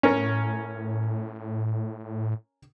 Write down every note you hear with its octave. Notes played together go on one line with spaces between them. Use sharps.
A2 C#4 A#4 C#5